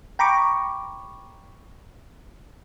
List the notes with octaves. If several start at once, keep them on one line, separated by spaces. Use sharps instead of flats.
G5 A#5 B5 C#6 D6